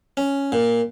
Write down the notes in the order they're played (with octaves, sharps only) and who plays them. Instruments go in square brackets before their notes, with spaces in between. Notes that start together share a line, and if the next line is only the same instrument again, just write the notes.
[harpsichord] C#4
A#2